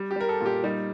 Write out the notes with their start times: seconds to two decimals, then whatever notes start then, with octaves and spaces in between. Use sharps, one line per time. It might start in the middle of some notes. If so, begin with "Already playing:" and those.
Already playing: G3
0.11 G4
0.16 G3 A#4
0.29 A4
0.41 A#2 G4
0.64 G3 D#4